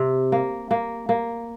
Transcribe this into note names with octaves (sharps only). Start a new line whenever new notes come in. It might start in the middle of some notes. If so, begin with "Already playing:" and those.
Already playing: C3
A#3
A#3
A#3